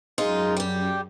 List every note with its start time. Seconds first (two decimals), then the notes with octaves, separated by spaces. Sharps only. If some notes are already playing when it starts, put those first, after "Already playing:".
0.18 F#2 G#3 D#4 F4
0.56 G3 G4